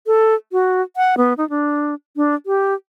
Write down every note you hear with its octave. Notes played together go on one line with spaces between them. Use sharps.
A4
F#4
F#5
B3
D#4
D4
D4
G4